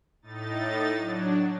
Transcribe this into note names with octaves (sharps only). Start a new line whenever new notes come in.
A2 D#4 A6
F#3 D4